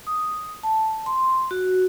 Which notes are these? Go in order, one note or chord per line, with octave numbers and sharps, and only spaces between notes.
D#6
A5
C6
F#4